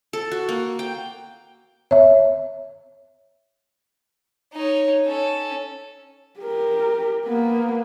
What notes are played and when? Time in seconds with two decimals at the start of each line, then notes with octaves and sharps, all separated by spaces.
0.13 A4
0.32 F#4
0.49 A#3
0.79 G5
1.91 C#5 E5
4.53 D#4 C#5
5.06 C#4 A4
6.40 G4 A#4
7.26 A#3 B3